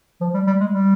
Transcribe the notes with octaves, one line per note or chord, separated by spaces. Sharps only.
F3
G3
G3
G#3
G3